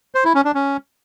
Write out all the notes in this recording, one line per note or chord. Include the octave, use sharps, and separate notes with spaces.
C5
E4
C#4
D4
C#4